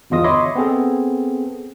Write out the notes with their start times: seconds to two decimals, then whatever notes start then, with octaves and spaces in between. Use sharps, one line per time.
0.10 G1 E2 F4 D#5 D#6
0.24 C#5 D#5 E5 B5 C6 D6
0.55 B3 C4 G#4 A4